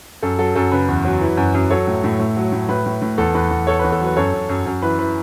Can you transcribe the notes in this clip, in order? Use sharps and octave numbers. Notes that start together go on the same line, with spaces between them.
F#2 A4
F#3 A4
F#2 A4
C#3 B4
E2
F#3
E3
F#2
F#2
F#3 A4 C#5
A2
A2
A2
F#3
A2
A2 B4
A2
A2
E2 A4
E2 B4
E2
E2 A4 C#5
B4
E2
A4
F#3 B4
F#2 A4 C#5
F#2
F#2
F#2
E3 B4
E3 B4